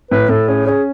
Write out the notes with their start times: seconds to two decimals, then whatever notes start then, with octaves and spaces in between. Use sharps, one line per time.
0.11 A2 B4
0.29 A2 A4
0.48 C#4 G#4
0.66 C#4 G#4